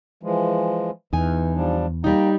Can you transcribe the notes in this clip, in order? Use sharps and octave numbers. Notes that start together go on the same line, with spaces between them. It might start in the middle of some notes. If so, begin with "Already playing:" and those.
E3 F3 G#3
E2 E3 D#4 G#5
F3 G3 D4
G3 A#3 D#4 G5 A#5